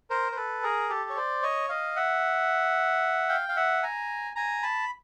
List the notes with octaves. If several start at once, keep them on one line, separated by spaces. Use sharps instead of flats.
A#4 C5
C5
A4 B4
G#4 A#4
G4 A4
C#5
C5 D5
C#5 D#5
D#5 F5
E5 F#5
F5 G5
F5
E5 F#5
G#5 A#5
G#5 A#5
A5 B5